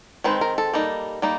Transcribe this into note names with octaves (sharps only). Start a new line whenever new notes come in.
D#3 G#3 C4 B4
A#4
A4
G3 A#3 D#4
G3 A#3 D#4